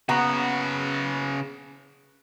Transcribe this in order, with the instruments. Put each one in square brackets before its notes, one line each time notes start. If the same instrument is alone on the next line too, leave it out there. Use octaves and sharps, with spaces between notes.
[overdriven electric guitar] C#3 F#4 [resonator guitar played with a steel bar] B3 [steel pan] F#5 A#5 C#6